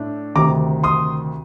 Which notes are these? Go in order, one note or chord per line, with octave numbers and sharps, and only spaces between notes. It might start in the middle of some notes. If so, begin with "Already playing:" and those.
Already playing: A2 A3 D4
D2 C3 D#3 A#5 D6
C6 D#6